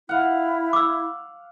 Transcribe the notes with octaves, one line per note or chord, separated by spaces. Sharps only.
E4 F5 F#5
D6 E6